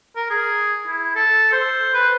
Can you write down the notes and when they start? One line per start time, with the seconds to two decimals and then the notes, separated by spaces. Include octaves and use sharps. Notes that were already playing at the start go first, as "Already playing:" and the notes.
0.16 A#4
0.30 G#4
0.87 E4
1.15 A4
1.52 C5
1.94 B4